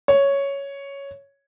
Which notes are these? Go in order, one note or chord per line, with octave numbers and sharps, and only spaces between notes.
C#5